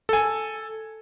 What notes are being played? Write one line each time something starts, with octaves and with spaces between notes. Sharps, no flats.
A4 G#5